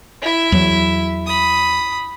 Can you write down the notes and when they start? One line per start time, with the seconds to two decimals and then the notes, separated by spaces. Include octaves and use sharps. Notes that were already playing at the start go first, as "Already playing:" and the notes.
0.22 E4 E5
0.52 E2 F#3
1.26 B5 D#6